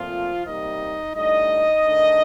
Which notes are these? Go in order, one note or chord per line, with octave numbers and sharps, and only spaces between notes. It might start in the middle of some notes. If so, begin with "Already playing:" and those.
Already playing: A#2 F3 A3 C4 F4
C3 G3 A#3 D#4 D#5
A2 G3 D4 D#4 D#5
D#3 A3 D4